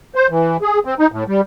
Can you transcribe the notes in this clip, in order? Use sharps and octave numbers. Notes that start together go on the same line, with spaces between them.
C5
E3
G#4
C4
D#4
A2
G3